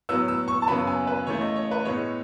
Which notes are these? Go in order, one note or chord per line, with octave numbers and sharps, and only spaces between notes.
A2 F#3 B3 E6
E6
C#6
A5
F#2 C#3 F#3 B3 B5
G#5
B4
C#3 E3 A3 C#5
D#5
C#5
B4
A2 G#3 B3 C#5